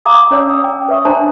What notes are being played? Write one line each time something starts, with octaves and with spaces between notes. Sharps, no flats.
F5 A#5 D6 D#6
C#4 C#5 D5 A5 E6
D#6
G5
B4 C#5 E5 C#6 D#6
D4 C5 D5 A5 A#5 C6